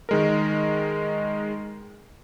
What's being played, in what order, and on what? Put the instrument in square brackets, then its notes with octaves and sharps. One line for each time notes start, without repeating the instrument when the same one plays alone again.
[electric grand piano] D#3 G#3 A#4